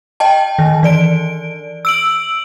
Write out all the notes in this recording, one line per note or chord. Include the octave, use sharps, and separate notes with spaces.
D#5 G5 A5
D#3
E3 D5 D7
E6 D7 F#7